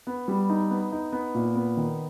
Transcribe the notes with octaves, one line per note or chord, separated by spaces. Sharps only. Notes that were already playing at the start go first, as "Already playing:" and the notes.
B3
G3
D#4
B3
D#4
B3
A#2
B3
D#3